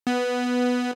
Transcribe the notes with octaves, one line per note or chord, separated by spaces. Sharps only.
B3